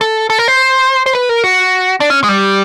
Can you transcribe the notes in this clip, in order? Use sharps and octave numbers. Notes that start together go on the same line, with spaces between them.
A4
A4
A#4
C5
C5
B4
A#4
F#4
D4
C#4
G#3
G3